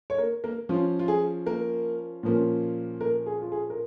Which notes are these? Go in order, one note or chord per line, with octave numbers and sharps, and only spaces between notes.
C#5
A#3 A#4
A#3 A#4
F3 C#4 F4
F4
G#4
A#3 A#4
A#2 F3 A#3 C#4
A#3 A#4
G#4
F4
G#4
A#4